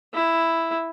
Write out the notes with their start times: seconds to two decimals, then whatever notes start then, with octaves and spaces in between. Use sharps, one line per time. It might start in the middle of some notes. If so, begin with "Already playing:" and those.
0.14 E4